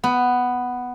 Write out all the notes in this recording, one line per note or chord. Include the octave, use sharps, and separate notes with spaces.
B3